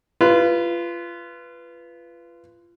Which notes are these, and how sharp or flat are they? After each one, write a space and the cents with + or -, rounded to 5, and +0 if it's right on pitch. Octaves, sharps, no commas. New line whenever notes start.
F4 -25 B4 +0